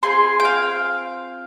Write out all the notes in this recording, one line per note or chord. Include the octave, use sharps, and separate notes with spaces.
C4 F4 G#4 C6
G5
F5